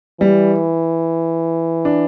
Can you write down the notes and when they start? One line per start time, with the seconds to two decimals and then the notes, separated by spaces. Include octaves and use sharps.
0.20 E3 G3
1.85 D4